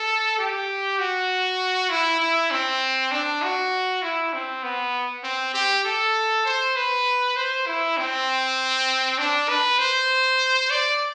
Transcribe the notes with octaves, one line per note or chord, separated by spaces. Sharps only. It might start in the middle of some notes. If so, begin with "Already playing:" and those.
Already playing: A4
G4
F#4
E4
E4
C4
D4
F#4
E4
C4
B3
C4
G4
A4
C5
B4
C5
E4
C4
D4
B4
C5
D5